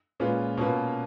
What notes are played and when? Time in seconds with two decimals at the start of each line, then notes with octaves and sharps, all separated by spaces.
0.20 A#2 G#3 C#4 F4 B4
0.57 B2 A#3 C#4 F4 B4